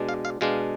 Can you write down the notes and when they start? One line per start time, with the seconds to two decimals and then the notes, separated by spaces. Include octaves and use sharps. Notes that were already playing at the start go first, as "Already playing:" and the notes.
Already playing: B2 G#3 D4
0.09 F5
0.25 F5
0.41 B2 G#3 D4 F5